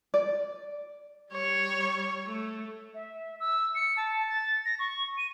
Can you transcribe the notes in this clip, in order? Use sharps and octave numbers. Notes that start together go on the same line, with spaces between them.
D5
G3 C#5
A3
E5
E6
C#7
A5
A6
A#6
C#6
D#7